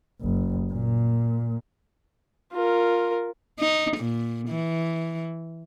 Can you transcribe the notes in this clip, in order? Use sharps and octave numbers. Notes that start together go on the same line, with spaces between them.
F#1
A#2
F4 A#4
D#4
A#2
E3